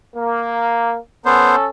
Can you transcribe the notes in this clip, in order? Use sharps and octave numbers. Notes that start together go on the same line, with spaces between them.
A#3
B3 C#4 A4 C5